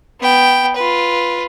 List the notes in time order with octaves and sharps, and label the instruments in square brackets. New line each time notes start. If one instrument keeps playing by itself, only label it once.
[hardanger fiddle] B3 G5
F4 B4